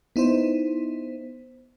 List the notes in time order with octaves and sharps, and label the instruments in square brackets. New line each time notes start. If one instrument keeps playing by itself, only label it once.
[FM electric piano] B3 D#4 E4 C5